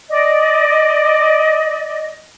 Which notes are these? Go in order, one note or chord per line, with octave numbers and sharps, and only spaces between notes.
D5 D#5